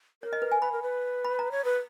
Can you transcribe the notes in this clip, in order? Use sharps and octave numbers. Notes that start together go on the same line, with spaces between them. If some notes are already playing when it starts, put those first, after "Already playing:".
A#4 C#5
D#5
B4
G#5
B4 B5
A#4
B4
B5
A#5
C#5
B4